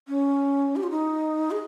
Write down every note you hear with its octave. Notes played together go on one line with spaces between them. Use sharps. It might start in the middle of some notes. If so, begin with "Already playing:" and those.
C#4
G4
F4
D#4
G#4